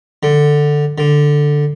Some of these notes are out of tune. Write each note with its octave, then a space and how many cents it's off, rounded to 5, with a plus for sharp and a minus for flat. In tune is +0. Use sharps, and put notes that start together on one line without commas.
D3 +10
D3 +5